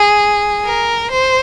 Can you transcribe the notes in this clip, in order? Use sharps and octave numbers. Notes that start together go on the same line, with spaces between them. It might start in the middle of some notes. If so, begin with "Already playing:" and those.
Already playing: G#4
A#4
C5